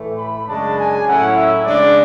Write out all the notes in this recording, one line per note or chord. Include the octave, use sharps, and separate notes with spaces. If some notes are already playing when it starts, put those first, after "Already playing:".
Already playing: A2 E3 A3
B5
F#2 C#3 G#3 D4 A5
G#5
A2 F#3 C#4 E4 F#5
E5
C#3 G#3 D4 D5